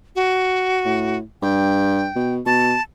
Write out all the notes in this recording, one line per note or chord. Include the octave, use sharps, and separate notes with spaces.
F#4
A2
G2 G5
B2
B2 A5